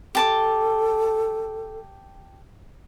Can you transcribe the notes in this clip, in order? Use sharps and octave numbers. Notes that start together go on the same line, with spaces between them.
G4 A4 A5 D6